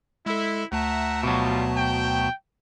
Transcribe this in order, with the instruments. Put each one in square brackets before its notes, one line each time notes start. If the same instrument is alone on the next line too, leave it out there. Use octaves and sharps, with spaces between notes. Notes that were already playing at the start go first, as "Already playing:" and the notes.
[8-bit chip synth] G#3 A4 [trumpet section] E4
[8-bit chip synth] D2 A3 A5 [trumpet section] E5 F#5 A#5
[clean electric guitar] B2 F#3 [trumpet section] G3 F4
[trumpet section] G5